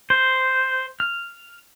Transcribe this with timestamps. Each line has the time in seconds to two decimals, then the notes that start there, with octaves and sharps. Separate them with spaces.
0.10 C5
1.00 F6